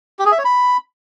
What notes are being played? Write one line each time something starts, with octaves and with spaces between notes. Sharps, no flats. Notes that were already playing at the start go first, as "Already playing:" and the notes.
G4
G#4
E5
C#5
B5